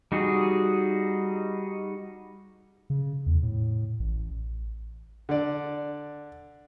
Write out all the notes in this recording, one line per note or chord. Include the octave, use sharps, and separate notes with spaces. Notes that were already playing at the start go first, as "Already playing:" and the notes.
G3 D#4 F#4 G#4
C#3
E2
A2
A1
D3 D5